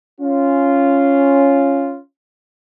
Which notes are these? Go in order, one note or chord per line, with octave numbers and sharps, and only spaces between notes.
C#4 F4